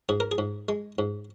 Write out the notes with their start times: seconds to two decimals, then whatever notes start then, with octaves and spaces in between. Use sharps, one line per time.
0.09 G#2 G#4
0.20 A#4
0.31 G#4
0.38 G#2
0.69 G#3
0.99 G#2